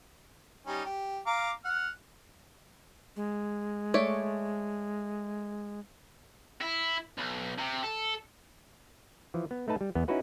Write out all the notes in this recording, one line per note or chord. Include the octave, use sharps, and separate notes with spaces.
G3 C#4 D#4
G4
F5 A#5 D6
F#5 F6
G#3
A3 C#5 D5
E4
B1
C3
A4
E3 F3
B3
A3 D#4 B4 A5
G3
E2 B3
C#4 D#4 E4 F#4 B4 F#5